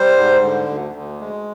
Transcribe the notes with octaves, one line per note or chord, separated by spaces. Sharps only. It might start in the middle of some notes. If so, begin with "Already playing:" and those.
Already playing: G3 C5
G#2
D3
D2
D2
G#3